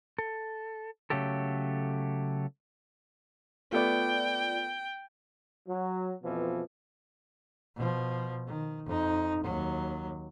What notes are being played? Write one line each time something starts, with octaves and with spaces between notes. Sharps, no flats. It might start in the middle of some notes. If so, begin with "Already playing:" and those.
A4
C#3 F#3 A3 G4 A4
A3 B3 F4 D5 G5
F#3
F2 B2 E3 F3
B2 F3
D#3
F2 D#4
D#2 F#3